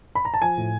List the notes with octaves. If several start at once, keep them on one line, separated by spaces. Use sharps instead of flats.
B5
A#5
A5
F3 G#5
A2